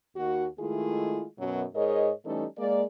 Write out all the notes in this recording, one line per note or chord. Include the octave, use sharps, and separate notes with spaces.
D#2 F#4
D#3 G#3 A3 E4 F4 G#4
F#2 B2 F#3
G#2 G#4 A#4 C#5 D#5
E3 G3 A3 C#4 D#4 A4
G#3 A#3 D5